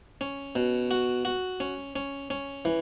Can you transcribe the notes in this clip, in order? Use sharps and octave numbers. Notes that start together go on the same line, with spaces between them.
C#4
B2
F#4
F#4
C#4
C#4
C#4
E3